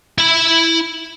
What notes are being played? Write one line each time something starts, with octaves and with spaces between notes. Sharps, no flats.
E4 B5